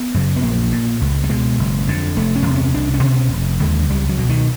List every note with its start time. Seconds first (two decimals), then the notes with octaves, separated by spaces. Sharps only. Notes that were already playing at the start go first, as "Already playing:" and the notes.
Already playing: B3
0.14 F#2 C#3
0.36 B3
0.43 A#1 A#3
0.72 A#2
1.01 C#2
1.24 G3
1.29 B2 G#3
1.59 F#1
1.88 F2 D3
2.17 F1 A3
2.36 C#4
2.46 E2 C3
2.55 C#4
2.74 C2 D4
2.94 C#4
3.03 B2
3.13 C#4
3.33 F1
3.61 D#2 D3 G#3
3.89 C#2 G3
4.09 F#3
4.18 B2
4.29 D#3